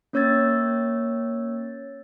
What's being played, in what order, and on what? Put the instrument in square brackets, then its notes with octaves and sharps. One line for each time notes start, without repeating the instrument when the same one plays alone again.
[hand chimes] A#3 C#4 C#5 E6 G#6 A6